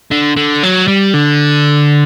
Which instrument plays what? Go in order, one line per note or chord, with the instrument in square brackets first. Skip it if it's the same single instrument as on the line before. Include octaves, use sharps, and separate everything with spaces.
[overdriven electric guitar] D3
D3
F#3
G3
D3